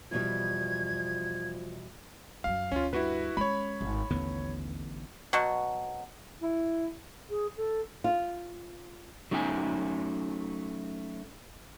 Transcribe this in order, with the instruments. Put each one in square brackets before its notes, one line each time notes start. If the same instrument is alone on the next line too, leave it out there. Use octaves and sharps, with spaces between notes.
[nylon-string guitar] E2 B2 G3 [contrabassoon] F3 [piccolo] G#6
[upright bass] F#2 F#3 [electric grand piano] F5
[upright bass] D2 [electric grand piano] C#4 F4
[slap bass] G2 [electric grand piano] E4 F#4 B4
[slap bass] G#3 [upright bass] C#4 [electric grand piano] C#5 B5
[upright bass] G#1
[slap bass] A1 D3 B3 [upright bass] D#2
[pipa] B2 F#3
[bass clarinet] E4
[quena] G#4
A4
[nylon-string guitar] F4
[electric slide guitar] F#3 A3 C#4 D#4 F#5 G#5